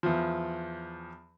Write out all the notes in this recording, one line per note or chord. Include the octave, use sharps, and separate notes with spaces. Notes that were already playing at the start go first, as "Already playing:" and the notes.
E2 F3